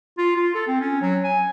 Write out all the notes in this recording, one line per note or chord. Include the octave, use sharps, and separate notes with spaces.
F4
F4
A4
C4
C#4
F#3
G#5